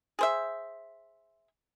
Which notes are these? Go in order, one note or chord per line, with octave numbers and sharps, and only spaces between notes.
G#4 C5 E5